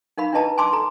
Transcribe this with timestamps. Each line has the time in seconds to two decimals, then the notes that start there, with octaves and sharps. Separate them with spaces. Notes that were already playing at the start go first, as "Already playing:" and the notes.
0.18 D#4 A#4 F5 B5
0.33 D4 E4 B4 D#5 A5 A#5
0.58 G#5 A5 C6 D6 E6
0.73 A4 A#5